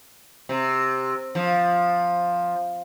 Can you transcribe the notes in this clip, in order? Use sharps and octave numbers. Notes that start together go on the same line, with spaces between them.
C3
F3